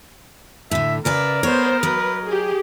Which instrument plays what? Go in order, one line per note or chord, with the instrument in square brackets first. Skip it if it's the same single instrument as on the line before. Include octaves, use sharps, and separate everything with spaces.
[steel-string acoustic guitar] A2 D3 [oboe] E5
[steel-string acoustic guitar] C#3 B4 E5 [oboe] A#4 [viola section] D5
[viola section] B3 C5 [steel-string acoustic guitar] C#5
[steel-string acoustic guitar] F#3 D#5 [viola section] B4
[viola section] G4 G#4